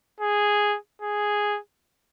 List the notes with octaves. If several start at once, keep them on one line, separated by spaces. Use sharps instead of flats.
G#4
G#4